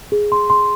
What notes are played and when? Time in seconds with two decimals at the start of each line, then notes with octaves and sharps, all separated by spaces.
0.12 G#4
0.32 C6
0.50 C6